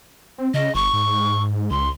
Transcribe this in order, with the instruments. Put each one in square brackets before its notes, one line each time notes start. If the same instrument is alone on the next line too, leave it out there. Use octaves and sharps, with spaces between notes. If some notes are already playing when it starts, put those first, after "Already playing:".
[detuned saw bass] C4
[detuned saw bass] C#3 [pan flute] D#5
[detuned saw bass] G1 [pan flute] C#6
[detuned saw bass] G#2
[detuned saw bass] C#2 [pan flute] C6